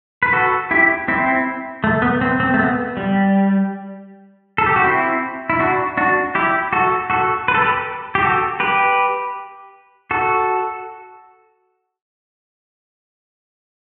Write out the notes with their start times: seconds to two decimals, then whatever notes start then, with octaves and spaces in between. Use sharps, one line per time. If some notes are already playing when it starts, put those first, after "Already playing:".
0.23 B4
0.33 F#4 A4
0.71 E4 G4
1.08 C4 E4
1.84 A3
2.02 B3
2.21 C4
2.40 C4
2.54 A3
2.59 B3
2.97 G3
4.58 A4
4.66 G4
4.76 F#4
4.84 C4 E4
5.50 E4
5.59 D4 F#4
5.97 D4 F#4
6.35 E4 G4
6.73 F#4 A4
7.10 F#4 A4
7.48 B4
7.55 A4
7.61 G4 B4
8.15 G4
8.22 F#4 A4
8.60 G4 B4
10.11 F#4 A4